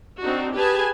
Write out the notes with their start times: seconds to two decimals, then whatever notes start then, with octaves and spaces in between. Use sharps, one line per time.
0.20 C4 D4 D#4 F#4
0.54 G4 G#4 B4 G#5 A5